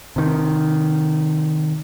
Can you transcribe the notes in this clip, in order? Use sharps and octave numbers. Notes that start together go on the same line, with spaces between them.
C3 D#3